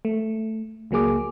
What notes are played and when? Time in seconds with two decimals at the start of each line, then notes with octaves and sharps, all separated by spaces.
0.05 A3
0.91 C#2 F#3 A#3 G#4 D6